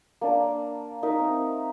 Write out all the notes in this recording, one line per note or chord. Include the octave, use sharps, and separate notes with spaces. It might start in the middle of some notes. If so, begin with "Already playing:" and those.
A#3 D4 D5
D#4 A#4 E5
C4